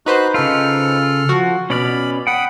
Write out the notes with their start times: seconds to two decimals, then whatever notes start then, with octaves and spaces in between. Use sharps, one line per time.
0.06 D#4 F#4 B4 C5 F#6
0.34 C#3 F4 A4 F6
1.29 F3 F#4
1.70 B2 C#4 D5 B5 F6
2.27 F#5 G5 B5 D#6